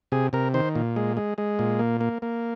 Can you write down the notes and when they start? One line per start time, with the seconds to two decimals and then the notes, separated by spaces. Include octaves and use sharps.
0.12 C3 G#4
0.33 C3 A#4
0.54 D#3 C5
0.75 A#2
0.96 G#3
1.17 G#3
1.38 G#3
1.59 A#2
1.79 A#3
2.01 A#3
2.22 A#3